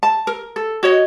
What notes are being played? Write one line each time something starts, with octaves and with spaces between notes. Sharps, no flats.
A5
A#4
A4
F#4 C#5 D#5